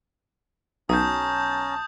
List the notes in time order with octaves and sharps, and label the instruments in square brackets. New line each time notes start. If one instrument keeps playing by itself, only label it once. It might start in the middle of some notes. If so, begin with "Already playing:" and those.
[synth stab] B1 [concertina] C#4 A#5 [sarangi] A5 [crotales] D#6 G6